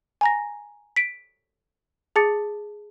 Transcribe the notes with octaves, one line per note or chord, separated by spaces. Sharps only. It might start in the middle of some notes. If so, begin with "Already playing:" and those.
G#5 A#5 A#6
B6 D7
G#4 A5 D6 A6 C#7